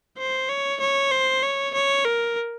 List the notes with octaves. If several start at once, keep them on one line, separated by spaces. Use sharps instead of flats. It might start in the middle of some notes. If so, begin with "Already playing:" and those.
C5
C#5
C#5
C5
C#5
C#5
A#4